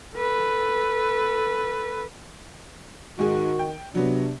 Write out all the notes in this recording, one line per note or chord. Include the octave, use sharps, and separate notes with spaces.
A4 B4
G#2 D#3 F#4 G#4
G5
C3 F#3 B3 D4